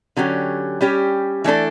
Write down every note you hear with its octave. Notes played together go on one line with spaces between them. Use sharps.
D3 F#3 C#4 G4
G3 C#4 G4
E3 A3 D4 A4